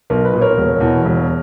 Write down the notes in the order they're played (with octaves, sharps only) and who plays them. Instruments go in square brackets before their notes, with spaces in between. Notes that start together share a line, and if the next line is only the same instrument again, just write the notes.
[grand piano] B1 A#4
B4
A#2
A#4 C#5
E1
E2 B2
E1